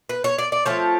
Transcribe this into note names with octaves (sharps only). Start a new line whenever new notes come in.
B4
C#5
D5
D5
F3 A3 C4 C#5